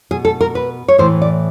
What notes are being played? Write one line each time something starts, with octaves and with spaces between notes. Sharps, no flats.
B2 G#4
A4
A#4
B4
C#5
A2 E3 C5
D5